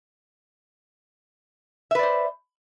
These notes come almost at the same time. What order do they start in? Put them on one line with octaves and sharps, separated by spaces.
E5 B4 D5 C5